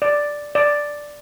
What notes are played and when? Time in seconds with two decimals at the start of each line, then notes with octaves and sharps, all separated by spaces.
0.02 D5
0.55 D5